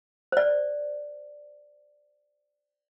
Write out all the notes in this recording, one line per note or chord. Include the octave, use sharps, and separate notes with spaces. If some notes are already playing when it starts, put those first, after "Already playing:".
C5 D5